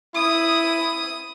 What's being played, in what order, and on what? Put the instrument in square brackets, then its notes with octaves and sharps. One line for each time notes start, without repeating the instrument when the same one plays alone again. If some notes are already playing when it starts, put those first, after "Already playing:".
[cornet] E4 [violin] D#6